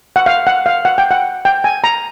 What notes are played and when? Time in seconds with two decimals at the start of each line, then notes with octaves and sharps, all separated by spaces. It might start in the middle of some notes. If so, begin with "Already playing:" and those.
0.16 F#5
0.26 F5
0.47 F#5
0.66 F5
0.85 F#5
0.98 G5
1.11 F#5
1.45 G5
1.64 G#5
1.84 A#5